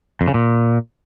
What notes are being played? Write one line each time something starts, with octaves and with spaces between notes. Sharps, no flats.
F2
C#3
A#2